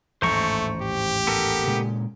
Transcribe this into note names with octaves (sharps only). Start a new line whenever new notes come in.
A1 D#2 G#2 A3 C5 A#5 C#6
G4
B3 A4 A#4
A#2 C#3 G#3